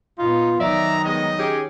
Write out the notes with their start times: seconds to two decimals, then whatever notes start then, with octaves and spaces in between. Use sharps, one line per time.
0.18 A#2 B3 D#4 F4
0.60 D#3 F#3 D#4 D5 E5 A#5
1.04 G3 G#3 B3 D#5
1.39 C#4 G4 G#4